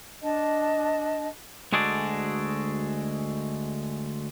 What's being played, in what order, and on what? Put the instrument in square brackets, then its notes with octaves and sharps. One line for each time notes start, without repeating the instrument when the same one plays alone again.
[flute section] D4 D#5 A5
[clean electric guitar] D2 G#3 F#4 G#4 A4 D5